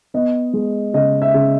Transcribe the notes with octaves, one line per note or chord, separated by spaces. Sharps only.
B3 D#5
G#3
C#3 D#5
E5
C#3